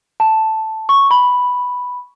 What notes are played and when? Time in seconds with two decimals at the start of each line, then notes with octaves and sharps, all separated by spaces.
0.20 A5
0.89 C#6
1.11 B5